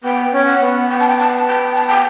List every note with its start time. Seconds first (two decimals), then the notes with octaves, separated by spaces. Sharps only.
0.04 B3 G5
0.33 C#4
0.46 F#5
0.62 B3
0.90 G5
1.00 A5
1.08 G5
1.19 A5
1.47 G5
1.75 A5
1.87 G5